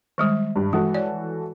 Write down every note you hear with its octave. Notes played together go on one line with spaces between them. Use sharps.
D#3 G3 G#3
G2
E3 G#3 F#4 A4
C#5 D5